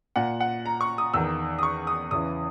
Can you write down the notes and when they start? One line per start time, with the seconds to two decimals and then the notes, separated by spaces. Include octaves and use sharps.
0.16 A#2 F#5
0.41 F#5
0.66 A#5
0.81 C#6
0.98 D#6
1.14 E2 D#3 E6
1.59 D#6
1.63 C#6
1.87 D#6
2.11 E2 C#3 E3 D#6